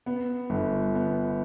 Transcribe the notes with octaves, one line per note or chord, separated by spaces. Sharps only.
B3
G1
B3